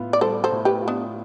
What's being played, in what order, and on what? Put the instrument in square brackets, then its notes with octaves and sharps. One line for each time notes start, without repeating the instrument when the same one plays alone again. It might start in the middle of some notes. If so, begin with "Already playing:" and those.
Already playing: [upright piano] A2 B3 F4
[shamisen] D5
[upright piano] G3 [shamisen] A4 C5
[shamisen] A4 C5
[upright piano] A2
[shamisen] G4 B4
[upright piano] F4
[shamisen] B3 D4